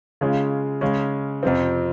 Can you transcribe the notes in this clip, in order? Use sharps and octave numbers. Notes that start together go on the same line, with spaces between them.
C#3 G#3 C#4 F4
C#3 G#3 C#4
F2 C3 F3 C4